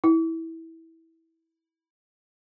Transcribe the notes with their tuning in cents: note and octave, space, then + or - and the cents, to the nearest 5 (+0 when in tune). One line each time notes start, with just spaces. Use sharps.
E4 -15